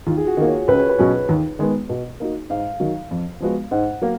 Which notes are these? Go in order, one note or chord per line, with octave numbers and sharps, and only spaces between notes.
D#2 F4
G#4
F#4
D#3 A#3
C#5
C#2 B4
C#5
B4
B2 F#3 C#4
D#2
D#3 G#3 B3
B2
A#3 D#4 F#4
G#2 F5
D#3 F#3
F2
F3 G#3 B3 F#4
G#2 F#5
F#3 A#3 A#4